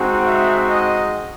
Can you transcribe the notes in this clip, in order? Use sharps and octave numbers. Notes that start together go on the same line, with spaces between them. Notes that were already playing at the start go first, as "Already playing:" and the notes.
Already playing: G#3 C4 D#4 F#4
E5
D#5